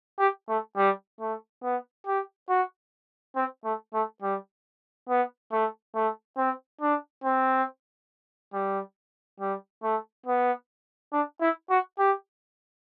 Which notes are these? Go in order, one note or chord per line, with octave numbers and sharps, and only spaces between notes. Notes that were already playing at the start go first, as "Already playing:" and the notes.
G4
A3
G3
A3
B3
G4
F#4
C4
A3
A3
G3
B3
A3
A3
C4
D4
C4
G3
G3
A3
B3
D4
E4
F#4
G4